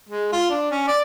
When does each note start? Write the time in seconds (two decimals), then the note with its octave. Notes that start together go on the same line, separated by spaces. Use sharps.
0.09 G#3
0.32 F4
0.50 D4
0.71 C#4
0.88 D5